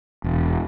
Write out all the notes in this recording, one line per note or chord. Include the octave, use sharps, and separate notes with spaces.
E1